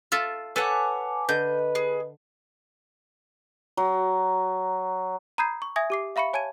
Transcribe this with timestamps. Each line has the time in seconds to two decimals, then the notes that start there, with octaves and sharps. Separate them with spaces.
0.12 F4 A4 E5
0.56 A4 B4 C#5 F#5 G#5 A5 D6
1.29 D3 B4 D#5 G6
1.75 G#4
3.77 F#3
5.38 A#5 B5 D#6 G6 G#6 C7
5.62 C#6
5.76 E5 G#5 D#6 G#6 A#6
5.90 G4 D6 C7
6.16 E5 F5 B5 C#6 C#7
6.34 C#5 G#5 A5 G#6 D#7